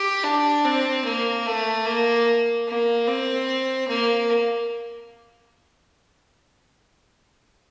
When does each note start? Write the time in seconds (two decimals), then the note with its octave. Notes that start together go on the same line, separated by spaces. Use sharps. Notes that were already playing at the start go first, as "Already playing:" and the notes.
Already playing: G4
0.24 D4
0.65 C4
1.05 A#3
1.46 A3
1.86 A#3
2.68 A#3
3.08 C4
3.88 A#3